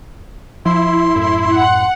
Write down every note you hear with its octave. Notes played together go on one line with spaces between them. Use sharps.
F3 E4 C6
F#2 A2
F#5